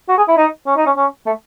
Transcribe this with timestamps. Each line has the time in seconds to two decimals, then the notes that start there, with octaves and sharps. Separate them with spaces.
0.09 F#4
0.18 G#4
0.28 E4
0.37 D#4
0.67 C#4
0.76 D#4
0.86 C#4
0.97 C#4
1.26 A3